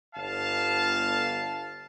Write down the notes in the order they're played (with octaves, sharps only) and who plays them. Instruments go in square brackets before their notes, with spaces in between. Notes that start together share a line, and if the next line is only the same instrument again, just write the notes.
[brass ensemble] G1 F5 A5